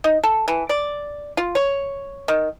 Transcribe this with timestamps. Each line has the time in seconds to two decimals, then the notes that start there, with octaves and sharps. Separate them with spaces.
0.04 D#4
0.23 A4
0.48 E3
0.69 D5
1.37 F4
1.55 C#5
2.28 D#3